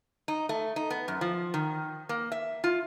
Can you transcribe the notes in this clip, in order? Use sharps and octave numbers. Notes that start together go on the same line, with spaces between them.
D#4
A3
D#4
B3
F#2
F3
D#3
A#3
E5
F4